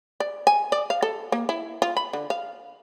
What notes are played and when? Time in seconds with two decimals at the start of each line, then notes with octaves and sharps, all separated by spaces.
0.20 D5
0.47 G#5
0.72 D5
0.90 F5
1.03 A4
1.32 A#3
1.49 E4
1.82 F4
1.97 B5
2.13 D3
2.30 F5